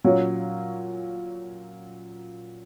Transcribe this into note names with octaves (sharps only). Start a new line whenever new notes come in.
A#2 F#3 C#4